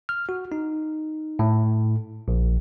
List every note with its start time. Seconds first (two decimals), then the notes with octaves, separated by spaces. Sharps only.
0.09 F6
0.29 F#4
0.52 D#4
1.39 A2
2.28 A#1